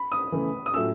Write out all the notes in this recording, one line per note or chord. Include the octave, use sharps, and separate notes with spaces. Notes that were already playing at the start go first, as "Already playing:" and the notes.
Already playing: B5
D#6
C#3 E3 A3
D#6
A2 F#3 A3 C#4 F4 E6